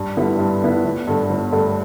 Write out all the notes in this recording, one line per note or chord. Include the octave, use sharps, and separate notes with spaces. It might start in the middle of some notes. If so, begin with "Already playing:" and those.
Already playing: G2
D3 G3 B3 E4
G2
D3 G3 B3 E4
G1
G2 D3 A3
G1
G2 D3 A3